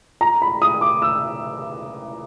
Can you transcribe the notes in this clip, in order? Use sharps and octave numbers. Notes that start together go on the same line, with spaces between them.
A#5
B5
D#6
D6
E6